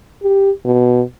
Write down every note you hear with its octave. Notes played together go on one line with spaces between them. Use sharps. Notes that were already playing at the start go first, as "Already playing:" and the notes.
G4
B2